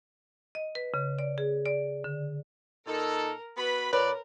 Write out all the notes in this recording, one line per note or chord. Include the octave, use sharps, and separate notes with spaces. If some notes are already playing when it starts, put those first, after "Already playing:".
D#5
B4
C#3
D5
G#4
D5
D3
A#2 D#4 A4 A#4
B3 F#4 B4 B5
A#2 A#4 B4 C#5 D5